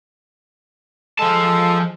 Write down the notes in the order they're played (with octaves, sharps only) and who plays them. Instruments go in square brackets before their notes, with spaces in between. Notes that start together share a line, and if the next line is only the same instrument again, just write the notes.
[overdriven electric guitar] F3 A5 [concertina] G#3 A4